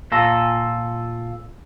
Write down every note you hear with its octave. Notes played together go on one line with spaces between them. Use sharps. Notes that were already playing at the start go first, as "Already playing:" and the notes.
A#2 F4 A4 A#5